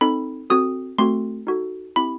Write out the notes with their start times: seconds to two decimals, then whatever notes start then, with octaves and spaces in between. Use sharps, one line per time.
0.01 C4 D#4 A4 B5
0.50 C4 F#4 A4 D#6
0.98 A3 C4 F#4 A4 C6
1.47 D#4 F#4 A4
1.96 C4 E4 G4 B5